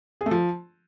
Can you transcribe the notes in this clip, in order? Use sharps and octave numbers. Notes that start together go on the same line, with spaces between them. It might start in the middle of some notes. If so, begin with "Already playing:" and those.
G#4
A3
F3